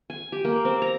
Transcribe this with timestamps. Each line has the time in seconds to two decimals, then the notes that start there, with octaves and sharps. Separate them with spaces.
0.10 G#5
0.32 G4
0.45 A#3
0.65 C4
0.82 A#5